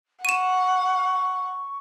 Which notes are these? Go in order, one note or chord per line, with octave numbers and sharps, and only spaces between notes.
F#5 C#6 D#7 E7